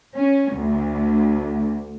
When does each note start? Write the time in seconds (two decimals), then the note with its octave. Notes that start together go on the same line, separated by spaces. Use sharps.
0.15 C#4
0.54 D2